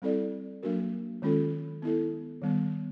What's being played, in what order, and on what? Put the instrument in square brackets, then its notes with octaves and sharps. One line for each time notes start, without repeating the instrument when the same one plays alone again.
[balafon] G3 C4 E4 A4 D5
F#3 A#3 D4 F#4 A#4
D#3 G#3 C#4 F4 A4
B3 E4 A4
D#3 G3 B3